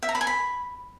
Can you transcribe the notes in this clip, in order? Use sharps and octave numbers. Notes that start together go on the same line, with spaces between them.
E5
A#5
B5
G#5
B5